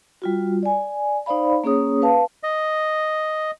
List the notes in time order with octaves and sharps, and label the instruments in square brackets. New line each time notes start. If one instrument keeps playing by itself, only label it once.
[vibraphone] G3 F4 F#4
D5 G#5
D#4 C5 D5 F5 B5
A#3 C#4 G#4 C#5 D#6
B4 F5 A5
[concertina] D#5